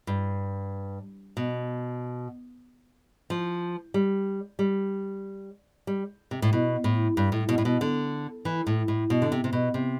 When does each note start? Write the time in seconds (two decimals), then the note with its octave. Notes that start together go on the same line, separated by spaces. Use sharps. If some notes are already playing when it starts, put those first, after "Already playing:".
0.07 G2
1.37 B2
3.30 F3
3.94 G3
4.59 G3
5.87 G3
6.31 C3
6.42 A2
6.53 B2
6.84 A2
7.17 G2
7.32 A2
7.49 B2
7.58 A2
7.65 B2
7.81 D3
8.45 E3
8.67 A2
8.88 A2
9.10 B2
9.22 D3
9.32 C3
9.44 C3
9.53 B2
9.74 C3